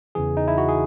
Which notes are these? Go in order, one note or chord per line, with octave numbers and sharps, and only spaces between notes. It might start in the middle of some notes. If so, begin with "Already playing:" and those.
E2 C#3 E3 G#4
D#4
E4
F#4
G#4